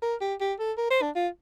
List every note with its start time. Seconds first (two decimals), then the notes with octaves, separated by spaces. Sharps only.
0.02 A#4
0.21 G4
0.41 G4
0.59 A4
0.78 A#4
0.91 C5
1.02 D4
1.15 F4